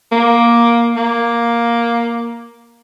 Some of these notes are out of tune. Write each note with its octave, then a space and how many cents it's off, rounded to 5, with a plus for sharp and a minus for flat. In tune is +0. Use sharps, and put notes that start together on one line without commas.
A#3 +10
A#3 +5